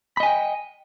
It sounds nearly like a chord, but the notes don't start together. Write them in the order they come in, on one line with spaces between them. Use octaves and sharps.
B5 D#5 G#5 G5